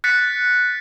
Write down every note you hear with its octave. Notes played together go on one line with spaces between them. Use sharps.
F#6 A6 B6 C#7